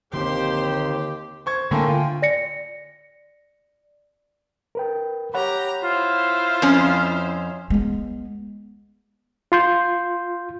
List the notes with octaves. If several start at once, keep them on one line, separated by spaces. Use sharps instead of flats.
D#2 D3 A#3 C4 G4 C5 C6
C5 C#6 G#6
A2 D3 A#3 A4 G5 G#5 C6
F4
D5 A#6 C#7
A#4 B4 G5
G4 C#5 F#5 A#5 B5
E4 F4 C5
F2 C#4
G#3 B3
F4 C6 G6